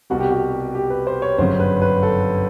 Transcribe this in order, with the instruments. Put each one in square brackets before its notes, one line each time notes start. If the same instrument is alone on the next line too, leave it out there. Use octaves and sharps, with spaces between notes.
[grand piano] C2 B2 G3 F#4
G4
F#4
G4
B4
C5
C#5
G1 F#2 C#3 C5
B4
B4
A4